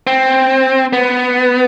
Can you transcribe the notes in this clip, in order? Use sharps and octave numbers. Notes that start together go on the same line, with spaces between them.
C4
B3